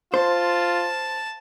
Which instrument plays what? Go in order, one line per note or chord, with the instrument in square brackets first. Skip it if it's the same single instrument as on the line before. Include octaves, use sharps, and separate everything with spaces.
[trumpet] F4 [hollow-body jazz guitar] C5 [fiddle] A5